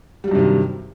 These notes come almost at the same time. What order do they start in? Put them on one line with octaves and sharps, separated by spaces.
G3 F#3 G2 C3 D#3